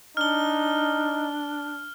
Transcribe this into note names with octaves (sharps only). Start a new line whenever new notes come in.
D4 D#4 F6 G7